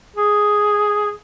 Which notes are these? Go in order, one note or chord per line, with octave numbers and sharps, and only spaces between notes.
G#4